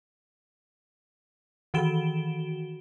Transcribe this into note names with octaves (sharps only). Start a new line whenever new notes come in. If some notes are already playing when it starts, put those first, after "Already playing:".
D#3 E3 F#4 D7 E7 G7